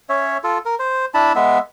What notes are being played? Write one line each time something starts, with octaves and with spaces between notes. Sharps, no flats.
C#4 C#5 E5
F4 A4
A#4
C5
D4 E4 A5 B5
G#3 B3 E5